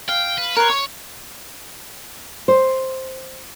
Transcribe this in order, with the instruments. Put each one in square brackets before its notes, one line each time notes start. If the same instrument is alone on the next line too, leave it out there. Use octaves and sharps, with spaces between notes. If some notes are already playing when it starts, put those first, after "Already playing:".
[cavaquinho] F5 [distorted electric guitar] G5
[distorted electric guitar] B4
[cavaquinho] A#4 B4 C6 [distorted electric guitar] C#5
[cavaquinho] C#6
[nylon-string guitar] C5